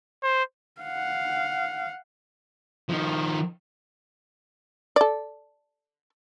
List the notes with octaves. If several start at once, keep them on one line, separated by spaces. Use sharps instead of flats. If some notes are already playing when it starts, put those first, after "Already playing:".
C5
F5 F#5
D#3 F3
A4 D5